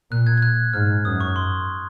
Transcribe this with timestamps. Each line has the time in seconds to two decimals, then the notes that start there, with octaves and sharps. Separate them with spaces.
0.11 A#2 F#6
0.27 G#6
0.37 G#6
0.42 F#6
0.73 G#2 F6
1.05 F#2 D#6
1.21 C#6
1.36 C6